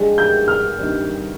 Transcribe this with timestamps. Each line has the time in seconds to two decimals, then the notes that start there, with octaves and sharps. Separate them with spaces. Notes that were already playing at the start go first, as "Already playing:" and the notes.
Already playing: F3 G#3 D4 G4
0.18 G6
0.48 F6
0.79 G2 D#3 G3 C4